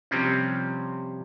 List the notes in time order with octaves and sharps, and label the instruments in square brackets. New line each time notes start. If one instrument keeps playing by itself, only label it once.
[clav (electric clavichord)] C3 F3 G3 C4 C#4